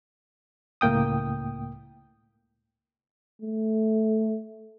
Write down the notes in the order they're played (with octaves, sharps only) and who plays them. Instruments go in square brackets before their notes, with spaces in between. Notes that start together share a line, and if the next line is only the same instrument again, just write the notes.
[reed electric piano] C#2 A2 A#3 G5 D#6
[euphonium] A3